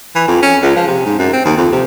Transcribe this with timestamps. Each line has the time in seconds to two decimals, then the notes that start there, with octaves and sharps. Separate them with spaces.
0.15 E3
0.28 F2
0.43 C#4
0.62 C#2
0.76 F3
0.88 C3
1.06 G#2
1.19 F#2
1.33 C4
1.45 D#2
1.57 F2
1.72 C3